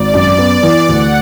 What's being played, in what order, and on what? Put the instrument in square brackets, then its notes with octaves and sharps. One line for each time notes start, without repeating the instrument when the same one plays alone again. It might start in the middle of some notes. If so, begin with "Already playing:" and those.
Already playing: [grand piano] G#1 [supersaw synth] D5
[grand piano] F#2
B3
E3
[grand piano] D2 [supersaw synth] F#5